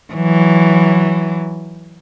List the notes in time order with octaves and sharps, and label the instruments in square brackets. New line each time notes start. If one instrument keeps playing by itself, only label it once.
[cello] E3 F#3